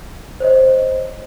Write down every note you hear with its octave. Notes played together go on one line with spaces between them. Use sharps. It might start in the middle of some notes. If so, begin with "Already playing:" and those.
C5 C#5 D#5